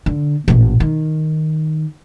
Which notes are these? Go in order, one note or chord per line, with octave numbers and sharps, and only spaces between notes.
D3
A1 A#2
D#3